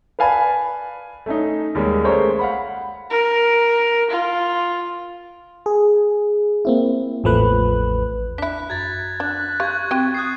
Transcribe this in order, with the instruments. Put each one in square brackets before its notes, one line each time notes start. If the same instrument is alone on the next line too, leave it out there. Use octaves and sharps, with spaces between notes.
[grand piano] B4 D5 F5 G#5 A5 B5
A3 C#4 D#4
D#2 G3 G#3 A#3 C#4
G#3 A3 A#4 C5 C#5
F5 F#5 B5
[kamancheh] A#4
F4
[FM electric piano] G#4
A#3 C4 E4
A1 E2 F3 A3 B4 F#6
[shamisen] D4 E4 [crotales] F#6 B6
[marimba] F#2 [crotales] G#6 A6
[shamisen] D4 [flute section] F#6
[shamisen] F4 [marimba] G4 [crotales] C#6 G#6
[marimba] C4 [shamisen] F#4 G4 G5
[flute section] D#6 [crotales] F#6 G#6 C7